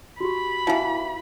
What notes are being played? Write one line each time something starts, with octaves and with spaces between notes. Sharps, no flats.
F#4 G4 B5
B2 E3 D#4 E4 F5